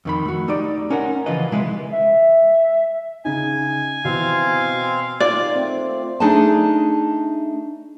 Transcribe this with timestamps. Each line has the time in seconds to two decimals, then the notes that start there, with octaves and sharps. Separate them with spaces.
0.05 F2 D#3 B5
0.25 A3 F#4
0.48 A3 D#4 G4 D5
0.90 C#4 D#4 A#4 F#5
1.26 C#3 E3 F3 F4 B4 D#5
1.51 C3 G#3 E4 G#4 B4
1.92 E5
3.25 C#3 D#4 G#5
4.05 B2 E3 C4 F5
5.20 D#3 A#3 F4 D5
5.54 A3 C4
6.20 A3 D4 D#4 G#4 G#5 A5